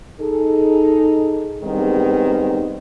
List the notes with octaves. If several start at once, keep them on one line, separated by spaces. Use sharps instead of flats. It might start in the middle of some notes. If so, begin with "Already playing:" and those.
D#4 G#4 A4
E2 G#2 D#3 G3 B3 C4